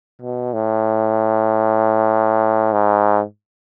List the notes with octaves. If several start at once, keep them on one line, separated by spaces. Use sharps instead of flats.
B2
A2
G#2